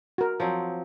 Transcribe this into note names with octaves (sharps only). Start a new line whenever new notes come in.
F#4 A#4
F3 F#3 C4